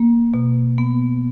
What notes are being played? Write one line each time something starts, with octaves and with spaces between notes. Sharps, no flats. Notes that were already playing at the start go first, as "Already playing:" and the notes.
Already playing: A#3
B2
B3